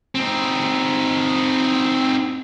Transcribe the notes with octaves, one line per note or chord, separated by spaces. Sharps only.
C4 D#4